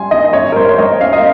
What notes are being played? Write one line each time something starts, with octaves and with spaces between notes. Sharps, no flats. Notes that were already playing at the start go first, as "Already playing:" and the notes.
Already playing: G3 C#4 G#5 C6
D#3 D#5
C#4 C#5
A#4
G3 C5
C#5
G3 D#5
C#4 F5
D#5